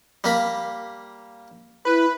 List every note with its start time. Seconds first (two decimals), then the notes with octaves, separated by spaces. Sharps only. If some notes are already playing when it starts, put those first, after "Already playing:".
0.24 G3 A#3 B5
1.86 E4 B4